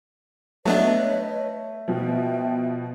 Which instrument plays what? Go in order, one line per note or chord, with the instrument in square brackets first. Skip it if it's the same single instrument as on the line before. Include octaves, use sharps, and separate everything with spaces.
[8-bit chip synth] F#3 B3 D4 [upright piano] A3 [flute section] B4 C#5 D#5
[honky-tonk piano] B2 F3 [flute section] E5 G5